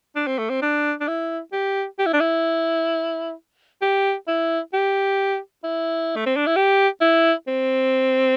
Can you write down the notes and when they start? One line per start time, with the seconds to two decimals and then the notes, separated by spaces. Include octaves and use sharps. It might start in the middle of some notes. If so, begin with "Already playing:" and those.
0.16 D4
0.27 C4
0.38 A3
0.50 C4
0.62 D4
1.00 D4
1.08 E4
1.52 G4
1.99 G4
2.06 E4
2.13 D4
2.20 E4
3.82 G4
4.28 E4
4.73 G4
5.64 E4
6.16 A3
6.26 C4
6.36 D4
6.46 E4
6.56 G4
7.01 E4
7.47 C4